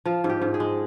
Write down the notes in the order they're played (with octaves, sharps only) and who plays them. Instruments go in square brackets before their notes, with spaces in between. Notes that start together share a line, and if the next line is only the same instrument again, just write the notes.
[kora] F3 F4
G#2
G4
G#2
G#4
G#3